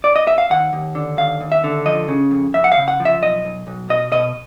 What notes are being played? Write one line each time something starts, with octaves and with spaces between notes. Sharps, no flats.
D5
D#5
E5
F5
D#2 F#5
D#2
D3
D#2 F5
D#2
E5
D3
F3 D#5
C#3
F2
F2 E5
F#5
F5
C#3
F#5
F3
E5
B1 D#5
B1
B1
B2 D#5
B2 D#5